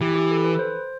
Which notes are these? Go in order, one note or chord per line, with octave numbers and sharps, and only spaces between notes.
E3 G4
G4
A4
B4
C5